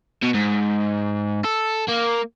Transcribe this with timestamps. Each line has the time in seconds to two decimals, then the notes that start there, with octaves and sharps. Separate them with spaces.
0.23 B2
0.35 G#2
1.45 A4
1.89 A#3